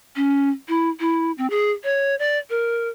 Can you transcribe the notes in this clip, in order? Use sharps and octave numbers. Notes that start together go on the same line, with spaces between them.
C#4
E4
E4
C4
G#4
C#5
D5
A#4